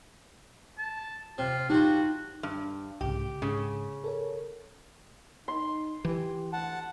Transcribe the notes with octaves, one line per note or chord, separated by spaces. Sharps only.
A5
C3 F4
G3 D#4 F4 F#4
G2
C2 G#2 C#3 G4
G#2 C#3
A4 A#4 C#5
D#4 C6
E3 G4
D2 F#5 A5